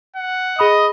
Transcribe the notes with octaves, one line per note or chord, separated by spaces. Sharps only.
F#5
G#4 D#5 B5 D#6